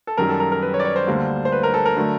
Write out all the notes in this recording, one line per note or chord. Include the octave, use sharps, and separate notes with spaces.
A4
F#2 D#3 G3 A#4
A4
A#4
A#4
B4
C#5
D5
C#5
C5
D2 D3 G3 A#3
C5
B4
A#4
A4
A#4
D3 F#3 A3